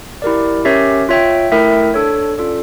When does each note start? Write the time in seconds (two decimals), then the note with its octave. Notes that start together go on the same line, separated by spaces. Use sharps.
0.22 E4 G4 A#4 D5
0.65 C#4 G4 A#4 C#5 E5
1.09 F4 C#5 E5 G5
1.52 A3 E4 A#4 E5 G5
1.94 D4 A4 C#5
2.38 C#4 F4 A4 D5